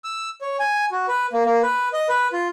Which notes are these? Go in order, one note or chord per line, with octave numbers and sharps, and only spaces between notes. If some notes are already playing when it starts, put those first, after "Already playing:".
E6
C#5
G#5
F#4
B4
A#3
A#3
B4
D#5
B4
F4